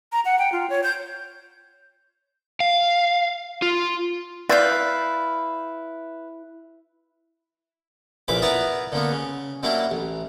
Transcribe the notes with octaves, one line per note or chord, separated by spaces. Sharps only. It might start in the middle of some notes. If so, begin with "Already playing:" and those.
A#5
F#5
G5
F4
C#5
G6
F5
F4
E4 B4 D5 F5 G6
A#1 A#2 E3 B5 D6
B3 E4 A#4 B4 D5 A#5
D3 A#3 B3
C#3
F#3 G3 A#3 D4 E4
A1